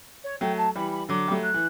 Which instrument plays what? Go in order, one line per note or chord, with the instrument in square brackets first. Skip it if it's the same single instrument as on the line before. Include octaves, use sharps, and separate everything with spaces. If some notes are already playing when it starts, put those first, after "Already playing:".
[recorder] C#5
[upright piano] F#3 A3 [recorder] G5
[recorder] A5
[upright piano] E3 G3 [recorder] B5
[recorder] B5
[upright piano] D3 F#3 [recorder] D6
[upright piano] G3
F#3 A3
[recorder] F#6
[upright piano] E3